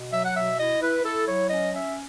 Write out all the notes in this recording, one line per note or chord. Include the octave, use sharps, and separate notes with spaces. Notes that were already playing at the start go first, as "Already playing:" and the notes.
Already playing: B2
F#3 E5
F#5
B2 E5
E4 D#5
E4 B4
E4 A4
F#3 C#5
C#4 D#5
C#4 E5